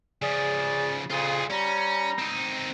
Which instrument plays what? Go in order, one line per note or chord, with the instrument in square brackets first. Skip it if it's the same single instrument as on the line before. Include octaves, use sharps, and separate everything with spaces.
[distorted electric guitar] C#3 F3 [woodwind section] G#4 D5
[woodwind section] F2 A#2 C#3 [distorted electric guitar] F4 G#4
[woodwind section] G3 A#5 [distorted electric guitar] C#4
[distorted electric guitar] C4 D#4